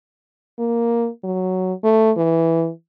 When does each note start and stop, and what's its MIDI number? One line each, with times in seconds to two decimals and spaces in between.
0.59 1.08 58
1.24 1.73 54
1.84 2.12 57
2.17 2.70 52